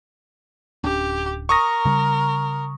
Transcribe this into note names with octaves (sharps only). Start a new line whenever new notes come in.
D1 C#4 D4 G4
A#4 C#6 D#6 A#6
C#3 G3